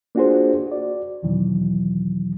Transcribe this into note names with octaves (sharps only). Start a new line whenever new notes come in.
A#3 D4 F4 F#4 G#4 C5
F#4 D5
E2 B2 D#3 E3 F#3